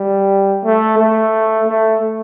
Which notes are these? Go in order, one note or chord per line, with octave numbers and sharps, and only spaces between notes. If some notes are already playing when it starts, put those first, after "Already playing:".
Already playing: G3
A3
A3
A3